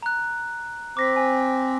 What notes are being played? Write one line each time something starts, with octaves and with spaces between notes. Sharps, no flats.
A#5 F#6
C4 D6 A#6 B6
G#5